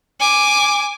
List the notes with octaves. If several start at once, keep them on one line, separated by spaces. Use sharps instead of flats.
G#5 D6